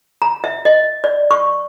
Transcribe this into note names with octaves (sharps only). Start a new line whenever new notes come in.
A#5
E5
D#5
D5
C#6